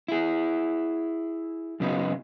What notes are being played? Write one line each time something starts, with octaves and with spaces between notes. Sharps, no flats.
E4 G#4
F#2 C#3 B3 D#4